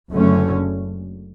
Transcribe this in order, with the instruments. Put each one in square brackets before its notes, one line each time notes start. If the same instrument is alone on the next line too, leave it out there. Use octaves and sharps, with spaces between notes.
[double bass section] F#1 F#2 D3 A3 C#4